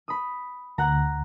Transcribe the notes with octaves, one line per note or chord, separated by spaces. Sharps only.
B5 D#6
D2 F#5 A#5